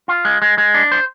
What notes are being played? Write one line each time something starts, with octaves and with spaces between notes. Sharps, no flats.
F4
G#3
G#3
G#3
D4
C5